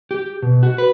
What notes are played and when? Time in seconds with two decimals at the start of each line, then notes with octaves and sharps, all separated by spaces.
0.11 G4
0.43 B2
0.63 F#4
0.78 B4